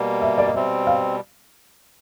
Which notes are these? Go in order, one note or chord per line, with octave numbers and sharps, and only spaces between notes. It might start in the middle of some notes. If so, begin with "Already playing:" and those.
Already playing: B2 G3 A#3
E5
D5
D#5
B2 G3 C4 E5
F5